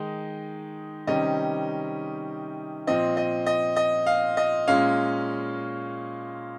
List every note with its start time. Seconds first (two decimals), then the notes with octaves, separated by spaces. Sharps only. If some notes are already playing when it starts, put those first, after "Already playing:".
Already playing: D#3 G#3 D#4
1.07 C3 D#3 G3 C#4 D#5
2.87 A#2 F3 C4 D#5
3.17 D#5
3.46 D#5
3.76 D#5
4.06 F5
4.37 D#5
4.67 A#2 G#3 C#4 F5